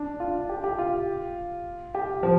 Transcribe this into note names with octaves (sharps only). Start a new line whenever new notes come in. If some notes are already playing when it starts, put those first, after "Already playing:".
Already playing: D4
F4
G4
G4
F4
G4
F3